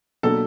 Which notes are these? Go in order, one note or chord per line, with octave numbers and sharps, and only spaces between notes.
B2 F#3 A#3 D4 A4